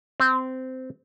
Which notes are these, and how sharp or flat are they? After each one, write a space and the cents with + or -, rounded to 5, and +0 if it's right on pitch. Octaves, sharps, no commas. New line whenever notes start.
C4 -15